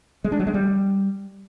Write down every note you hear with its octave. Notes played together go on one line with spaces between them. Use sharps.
G#3
D4
F#3
G#3
G3